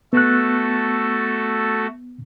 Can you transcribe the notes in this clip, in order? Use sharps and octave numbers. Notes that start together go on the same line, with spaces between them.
A3 B3 F#4 A4 F#6